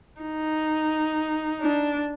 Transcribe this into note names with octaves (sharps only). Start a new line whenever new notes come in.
D#4
D4